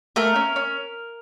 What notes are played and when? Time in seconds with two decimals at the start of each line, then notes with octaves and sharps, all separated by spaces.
0.16 A3 A#4
0.36 C#4
0.56 C#4